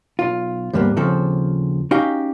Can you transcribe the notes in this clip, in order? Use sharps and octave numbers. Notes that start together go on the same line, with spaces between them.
B1 F4
D#2 G#2 G3 A#3 B3
D#2 C#3 F3 C4 A4
C#4 D#4 F#4 G4 F5 G5